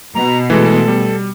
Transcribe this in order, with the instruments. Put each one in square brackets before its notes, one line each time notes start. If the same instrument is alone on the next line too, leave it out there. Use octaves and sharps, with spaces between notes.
[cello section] B2 [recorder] A#5
[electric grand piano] E3 G#3 [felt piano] A3 B3 [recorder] A4
[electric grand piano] G3